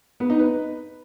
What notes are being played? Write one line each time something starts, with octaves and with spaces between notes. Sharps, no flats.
B3
D#4
B4